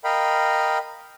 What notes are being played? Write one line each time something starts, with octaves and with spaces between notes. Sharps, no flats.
A#4 D#5 F5 G5 B5